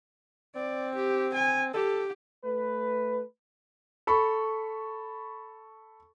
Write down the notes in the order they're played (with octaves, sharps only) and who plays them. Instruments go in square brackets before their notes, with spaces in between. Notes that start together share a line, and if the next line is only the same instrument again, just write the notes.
[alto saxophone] C4 [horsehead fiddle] D5
[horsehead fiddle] G4
G#5
[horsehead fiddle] G4 [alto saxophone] A4
[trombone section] A3 B4
[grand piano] A4 B5 C#6